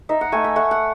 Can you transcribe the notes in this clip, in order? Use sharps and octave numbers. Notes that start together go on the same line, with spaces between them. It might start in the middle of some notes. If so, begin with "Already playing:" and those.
D#4 E5
F#5
A3 G#5
E5
A3 F#5
F#5